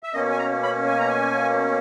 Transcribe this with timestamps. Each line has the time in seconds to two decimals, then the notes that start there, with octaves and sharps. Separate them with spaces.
0.03 E5
0.13 B2 A#3 C#4 D#5
0.32 G#5
0.39 A#5
0.63 B5
0.88 G#5
0.98 A#5
1.09 G#5